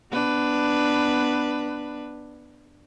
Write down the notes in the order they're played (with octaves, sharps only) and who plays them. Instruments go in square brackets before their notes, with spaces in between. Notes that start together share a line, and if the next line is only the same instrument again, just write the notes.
[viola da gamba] B3 D4 B4